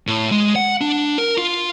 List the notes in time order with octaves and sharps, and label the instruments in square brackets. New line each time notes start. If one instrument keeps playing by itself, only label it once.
[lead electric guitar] A2
G#3
F#5
D4
A#4
F4